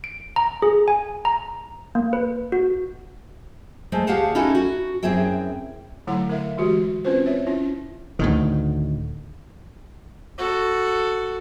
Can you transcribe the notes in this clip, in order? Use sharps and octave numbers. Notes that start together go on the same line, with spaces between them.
D7
A#5
G#4
G#5
A#5
A#3
B4
F#4
G#3 A3 C5
D2 G4 G#4 F5 F#5 A5
C#4 D#4 E4 F#4 A4
F#4
F#2 C4 E4 G#4 E5 G5
D3 F#3 A3 E4 F#5 A#5
A#4 E5 F5
E3 G#3 F#4 G4
C4 C#4 F4 B4 C5
C#5 E5
C#4 E4 F4
D2 A2 D#3
F#4 A4